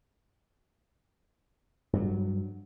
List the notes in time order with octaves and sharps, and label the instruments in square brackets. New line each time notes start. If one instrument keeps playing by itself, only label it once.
[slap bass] G2 F#3